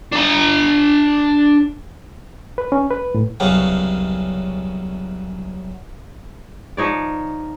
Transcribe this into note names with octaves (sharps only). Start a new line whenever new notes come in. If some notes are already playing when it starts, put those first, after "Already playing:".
D4 A#5
B4
C#4
B4
A2
C2 F#2 C#3 B3 C#4 F5
F3 D#4 C#5 D5